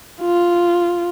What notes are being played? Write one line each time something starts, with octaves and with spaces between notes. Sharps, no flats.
F4